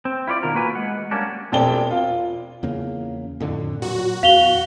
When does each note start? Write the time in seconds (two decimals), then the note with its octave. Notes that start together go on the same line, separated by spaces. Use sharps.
0.05 C4
0.27 E4 F4 C#5 D5
0.43 B2 D#3 F4 A#4
0.54 A#3 F#4 B4 G#5
0.75 G#3 F#5
1.11 G3 A#3 C#4 D4
1.52 E1 F2 D5 G5 A5 G7
1.91 F4
2.63 E2 C#3 A#3
3.40 F2 A2 D3
3.82 A#2 F#3 F#4
4.23 E2 F5 F7 G7